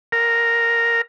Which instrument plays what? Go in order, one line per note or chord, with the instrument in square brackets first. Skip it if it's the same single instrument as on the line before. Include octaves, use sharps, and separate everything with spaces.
[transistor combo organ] A#4